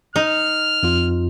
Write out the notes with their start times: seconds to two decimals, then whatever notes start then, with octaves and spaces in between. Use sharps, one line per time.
0.16 D#4 F6
0.83 F2 F4